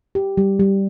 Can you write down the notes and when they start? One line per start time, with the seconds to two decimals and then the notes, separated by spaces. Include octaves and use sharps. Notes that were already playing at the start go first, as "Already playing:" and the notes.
0.15 G4
0.37 G3
0.60 G3